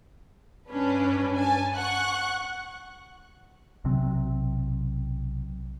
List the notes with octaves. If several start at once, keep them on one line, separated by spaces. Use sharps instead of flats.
G2 C#4 D4 B4
G#5 A5
F#5 C#6 F#6
B1 C3 F#3 C4